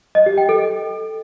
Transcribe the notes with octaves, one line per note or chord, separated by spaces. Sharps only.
D#5
G4
G5
A4